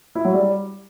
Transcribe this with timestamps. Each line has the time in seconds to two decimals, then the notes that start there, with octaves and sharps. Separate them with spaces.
0.15 E4
0.25 F#3
0.34 G3